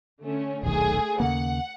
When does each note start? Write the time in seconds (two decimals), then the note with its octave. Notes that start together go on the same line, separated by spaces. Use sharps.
0.22 D3 A3 C#4
0.63 D#1 B1 D#3 A3 G#4
1.20 D#2 C#3 A#3 F#5